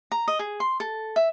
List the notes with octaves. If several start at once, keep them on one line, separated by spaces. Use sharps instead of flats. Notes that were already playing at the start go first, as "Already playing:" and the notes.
A#5
D#5
G#4
C6
A4
E5